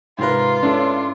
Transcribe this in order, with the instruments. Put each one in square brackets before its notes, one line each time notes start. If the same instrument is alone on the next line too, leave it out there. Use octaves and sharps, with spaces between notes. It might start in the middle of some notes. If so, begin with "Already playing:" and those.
[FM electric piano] G#2 B4 [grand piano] C3 A#4 [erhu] F4
[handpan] C#4 [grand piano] D4 E4 A4